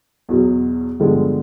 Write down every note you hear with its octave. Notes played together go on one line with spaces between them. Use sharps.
E2 B2 F#3
G2 D3 F3 G#3 B3